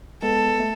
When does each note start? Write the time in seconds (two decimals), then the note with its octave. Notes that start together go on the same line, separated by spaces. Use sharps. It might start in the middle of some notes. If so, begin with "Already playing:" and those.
0.22 G#3 B3 A4
0.60 A3